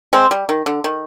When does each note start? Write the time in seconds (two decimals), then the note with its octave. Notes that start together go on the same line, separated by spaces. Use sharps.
0.13 G#3 C4
0.31 G3
0.49 D#3
0.66 D3
0.84 D#3